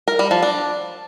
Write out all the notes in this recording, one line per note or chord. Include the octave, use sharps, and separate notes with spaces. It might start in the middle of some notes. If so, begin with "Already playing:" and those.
A#4
G3
F3
D4